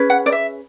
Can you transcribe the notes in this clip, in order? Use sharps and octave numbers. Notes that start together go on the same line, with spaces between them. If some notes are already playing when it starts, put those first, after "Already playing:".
Already playing: C#4 G#4 B4
F#5
D5
E5